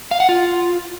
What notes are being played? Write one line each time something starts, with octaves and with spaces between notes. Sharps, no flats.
F5
F#5
F4